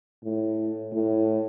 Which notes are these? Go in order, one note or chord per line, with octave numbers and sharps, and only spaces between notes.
A2
A2